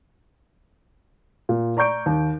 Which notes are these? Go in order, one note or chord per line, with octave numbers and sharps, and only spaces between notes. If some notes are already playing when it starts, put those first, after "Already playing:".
A#2
D5 A#5 C#6 G6 D7
D#2